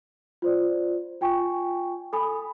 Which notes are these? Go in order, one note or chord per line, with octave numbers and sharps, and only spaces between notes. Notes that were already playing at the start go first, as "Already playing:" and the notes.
F4 C5 D5
F4 G5 G#5 C#6
A4 G#5 B5 D#6